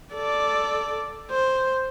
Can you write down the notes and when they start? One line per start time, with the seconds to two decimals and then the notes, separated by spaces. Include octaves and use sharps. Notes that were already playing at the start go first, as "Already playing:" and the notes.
0.14 A4 D5
1.31 C5